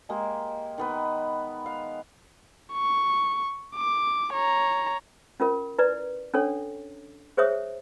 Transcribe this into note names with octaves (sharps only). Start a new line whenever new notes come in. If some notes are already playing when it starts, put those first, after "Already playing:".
G#3 A#3 G4
D#3 B3 B4
F5
C#6
D6
C#5 A#5
C#4 F4 A#4
E4 B4 D5
C#4 D4 A4 C#5
G#4 C5 C#5 E5 D#6